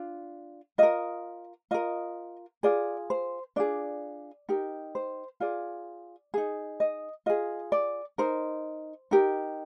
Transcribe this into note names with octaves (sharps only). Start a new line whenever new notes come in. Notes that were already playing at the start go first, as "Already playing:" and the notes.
Already playing: D4 F4
F4 A#4 D#5
F4 A#4 D#5
F4 G#4 D5
C5
D4 F4 G#4 D5
D#4 G4 A#4
C5
F4 G#4 D5
D#4 G#4
D#5
F4 G#4 D#5
D5
D#4 A#4 C5
D#4 G4 A#4